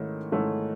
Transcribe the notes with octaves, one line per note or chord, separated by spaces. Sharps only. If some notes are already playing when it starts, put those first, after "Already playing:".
Already playing: G#2 D#3 A3 C#4 E4
G#2 D#3 A3 C#4 E4